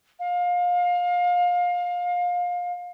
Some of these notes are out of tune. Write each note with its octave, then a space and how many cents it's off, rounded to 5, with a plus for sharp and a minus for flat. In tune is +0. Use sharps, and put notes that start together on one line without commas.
F5 +25